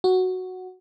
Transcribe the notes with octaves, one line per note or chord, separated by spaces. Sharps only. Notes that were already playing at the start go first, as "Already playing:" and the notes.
F#4